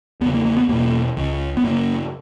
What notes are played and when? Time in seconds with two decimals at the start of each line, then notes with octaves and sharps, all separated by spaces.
0.21 E2 B3
0.25 C#3
0.34 A#3
0.45 A#3
0.57 B3
0.69 E2 B2 A#3
1.17 C#2 C#3
1.57 B3
1.64 F#2 C#3 A#3